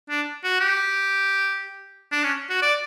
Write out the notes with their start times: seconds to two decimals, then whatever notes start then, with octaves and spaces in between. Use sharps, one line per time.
0.10 D4
0.43 F#4
0.60 G4
2.12 D4
2.24 C#4
2.50 F#4
2.62 D5